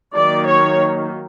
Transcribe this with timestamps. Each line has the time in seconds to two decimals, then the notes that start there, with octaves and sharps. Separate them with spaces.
0.15 D#3 F#3 A#3 D5
0.48 C#5